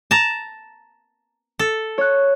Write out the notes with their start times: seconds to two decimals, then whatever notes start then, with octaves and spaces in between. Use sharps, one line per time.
0.11 A5 A#5
1.59 A4
1.98 C#5 F#6